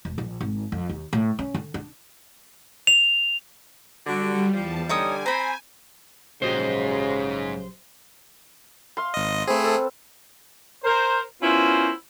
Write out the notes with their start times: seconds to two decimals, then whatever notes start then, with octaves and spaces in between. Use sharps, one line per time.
0.05 E1
0.18 A#1
0.41 G#1
0.72 F2
0.89 D#2
1.13 A2
1.39 C#4
1.54 D3
1.74 D4
2.87 F7
4.07 D3 G3 F#4
4.54 E2 F3 G3 A5
4.89 D3 G3 D#4 C#5 G#5 D#6
5.26 C4 C5 A#5 B5
6.42 A#1 G#2 C#3 F#3 G4 C5 D#5
8.97 F5 C6
9.14 G#1 D#5
9.47 A3 C4 G#4 B4
9.64 A4
10.84 A#4 C5
11.42 B3 C#4 E4 F4 A#4 C5